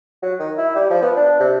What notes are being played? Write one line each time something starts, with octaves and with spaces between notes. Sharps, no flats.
F#3
D#3
E4
G3
F3
B3
D4
C3